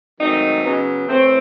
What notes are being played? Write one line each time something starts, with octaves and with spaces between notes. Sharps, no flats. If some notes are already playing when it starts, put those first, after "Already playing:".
G#2 D#3 F#3 A3 C4 D#4
C#3 F#3 B3
A2 E3 A3 C4